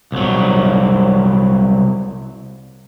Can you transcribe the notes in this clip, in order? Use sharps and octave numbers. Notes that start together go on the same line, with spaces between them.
C2 F#3